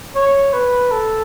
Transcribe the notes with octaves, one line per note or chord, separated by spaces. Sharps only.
C#5
B4
A4